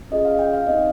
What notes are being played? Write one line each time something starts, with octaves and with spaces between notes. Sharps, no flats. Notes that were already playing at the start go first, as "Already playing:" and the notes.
C#4 F4 G#4 D#5
F5
G5
F5
C4 D#4 G4 D#5